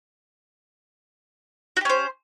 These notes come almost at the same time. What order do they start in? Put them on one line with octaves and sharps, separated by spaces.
F#4 G4 C#4 C5